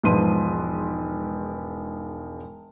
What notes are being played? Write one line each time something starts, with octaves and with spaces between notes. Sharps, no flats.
E1 G#2 F3 B4 C6 D#7